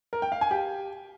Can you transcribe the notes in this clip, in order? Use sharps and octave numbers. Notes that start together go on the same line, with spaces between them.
A#4
G5
F5
G#5
G4